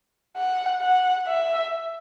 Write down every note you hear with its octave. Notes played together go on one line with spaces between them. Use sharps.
F#5
F#5
E5